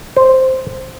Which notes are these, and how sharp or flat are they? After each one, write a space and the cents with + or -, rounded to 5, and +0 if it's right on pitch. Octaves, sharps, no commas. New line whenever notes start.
C5 +0